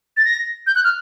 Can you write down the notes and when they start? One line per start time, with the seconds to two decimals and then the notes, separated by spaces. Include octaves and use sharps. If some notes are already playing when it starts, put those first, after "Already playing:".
0.17 A6
0.25 A#6
0.67 G6
0.75 F#6
0.84 F6